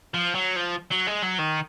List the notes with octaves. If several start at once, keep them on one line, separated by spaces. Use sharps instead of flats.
F3
F#3
F3
F#3
G#3
F#3
D#3